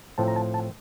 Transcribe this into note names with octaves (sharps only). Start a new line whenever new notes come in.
A2 F3 C4 A5
A#5
A5
A5